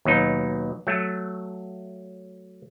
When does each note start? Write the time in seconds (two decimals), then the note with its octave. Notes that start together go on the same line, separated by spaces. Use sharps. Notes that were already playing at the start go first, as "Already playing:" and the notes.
0.05 D#2 B2 F#3 D#4
0.87 F#3 A3